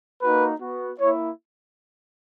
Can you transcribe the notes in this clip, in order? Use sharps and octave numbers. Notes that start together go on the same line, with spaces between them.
A#3 D#4 F#4 B4
B3 F#4
A#3 E4 C#5